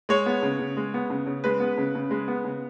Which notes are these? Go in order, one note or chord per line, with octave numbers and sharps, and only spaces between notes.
G#3 C#5
B3
C#3
C#3
G#3
B3
C#3
C#3
G#3 B4
B3
C#3
C#3
G#3
B3
C#3